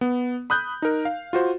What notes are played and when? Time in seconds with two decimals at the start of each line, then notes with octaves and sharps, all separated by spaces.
0.01 B3
0.50 B5 D#6 F#6 G6
0.82 D#4 A#4
1.05 F5
1.33 F4 F#4 C5